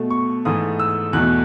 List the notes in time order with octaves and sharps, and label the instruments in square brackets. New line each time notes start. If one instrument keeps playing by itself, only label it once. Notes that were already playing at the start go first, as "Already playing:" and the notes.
Already playing: [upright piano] B2 A3
C#6
G#2 E3 A3 D#6
E6
E2 B2 A3 F#6